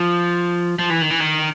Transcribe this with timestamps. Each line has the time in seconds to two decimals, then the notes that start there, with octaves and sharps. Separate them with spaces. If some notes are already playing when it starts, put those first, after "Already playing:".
Already playing: F3
0.79 F3
0.90 E3
1.02 D#3
1.10 E3
1.20 D#3